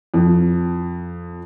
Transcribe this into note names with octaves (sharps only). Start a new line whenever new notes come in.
F2